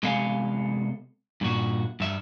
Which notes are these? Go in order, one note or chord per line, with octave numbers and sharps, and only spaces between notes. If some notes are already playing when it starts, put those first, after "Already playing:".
C3 G#3 B3 A4 F5 G#5
G2 A#2 F#4
G2 E5